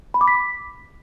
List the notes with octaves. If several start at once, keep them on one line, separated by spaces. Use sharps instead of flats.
B5
D6
B6